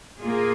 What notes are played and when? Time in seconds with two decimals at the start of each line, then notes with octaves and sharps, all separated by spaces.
0.21 A#2 A#3 F4 G#4